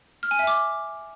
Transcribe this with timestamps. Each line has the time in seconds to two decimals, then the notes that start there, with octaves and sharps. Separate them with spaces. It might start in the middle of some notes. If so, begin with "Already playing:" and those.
0.23 F6
0.31 G#5
0.39 E5
0.47 D6